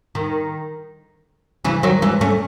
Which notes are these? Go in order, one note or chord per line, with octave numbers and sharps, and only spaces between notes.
D#3
C#3 E3
D#3 F#3
E3 G#3
A3 C#4